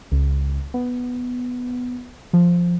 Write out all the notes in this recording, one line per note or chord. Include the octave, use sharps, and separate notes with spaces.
C#2
B3
F3